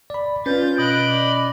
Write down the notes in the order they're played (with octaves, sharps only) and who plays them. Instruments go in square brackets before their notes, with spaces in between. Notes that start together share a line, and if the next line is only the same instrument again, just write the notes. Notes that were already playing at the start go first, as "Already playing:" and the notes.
[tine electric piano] D5 B5
[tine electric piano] C#4 [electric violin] F4 A6 [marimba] B4 [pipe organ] G6
[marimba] B2 [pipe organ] D#5 B5 [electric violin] F#6 D7
[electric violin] D5